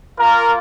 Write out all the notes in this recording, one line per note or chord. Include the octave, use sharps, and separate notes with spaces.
A#3 F4 A#4